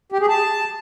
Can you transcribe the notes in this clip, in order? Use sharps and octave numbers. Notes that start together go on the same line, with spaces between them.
G4
G#4
A5